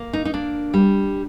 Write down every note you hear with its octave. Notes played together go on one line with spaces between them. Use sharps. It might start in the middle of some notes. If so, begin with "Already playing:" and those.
Already playing: A#3
D#4
D#4
A#3 D4
G3